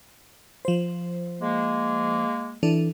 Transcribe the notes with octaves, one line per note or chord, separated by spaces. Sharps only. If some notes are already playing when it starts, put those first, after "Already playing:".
F3 C5
G#3 A#3
E3 D4 A4